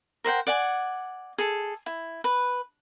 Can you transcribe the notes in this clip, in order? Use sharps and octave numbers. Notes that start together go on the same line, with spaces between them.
A#4 C5 F#5 G5
D5 F#5 G#5
G#4 A4
E4
B4